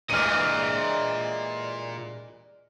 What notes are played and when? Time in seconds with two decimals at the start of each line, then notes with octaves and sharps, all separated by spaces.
0.10 G2 A#2 E3 G#3 D5 D#5 F6 D#7